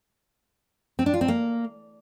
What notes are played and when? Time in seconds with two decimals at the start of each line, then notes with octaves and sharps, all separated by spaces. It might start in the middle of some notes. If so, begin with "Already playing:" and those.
0.99 C4
1.06 D4
1.14 F4
1.21 C4
1.28 A#3